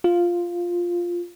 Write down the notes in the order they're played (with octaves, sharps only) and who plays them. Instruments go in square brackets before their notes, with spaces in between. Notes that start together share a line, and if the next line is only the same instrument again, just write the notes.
[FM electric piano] F4